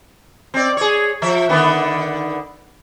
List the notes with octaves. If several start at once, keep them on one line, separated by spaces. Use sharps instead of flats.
C4 D5
G#4 C#5
F3 E5
D3 D#3 B3